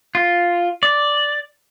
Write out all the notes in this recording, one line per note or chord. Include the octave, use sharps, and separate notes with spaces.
F4
D5